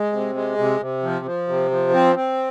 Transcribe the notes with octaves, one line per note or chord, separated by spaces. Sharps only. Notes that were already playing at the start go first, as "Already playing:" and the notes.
Already playing: G#3
C3
G#3
C3
C3
F3
F3
C3
F3
C4
C4